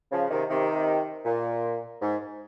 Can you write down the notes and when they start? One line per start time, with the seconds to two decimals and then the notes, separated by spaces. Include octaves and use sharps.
0.11 C#3 F3
0.30 C3 D#3
0.50 C3 D#3
1.25 A#2
2.02 G#2